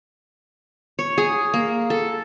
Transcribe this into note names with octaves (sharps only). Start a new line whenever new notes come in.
C#5
G#4
A#3
A4